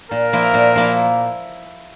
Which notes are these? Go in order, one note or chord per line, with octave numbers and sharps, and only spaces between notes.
A#2 A#4
F3 A#3 E4
A#2
F3 A#3 E4